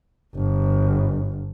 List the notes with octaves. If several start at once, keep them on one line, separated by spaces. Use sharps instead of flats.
G1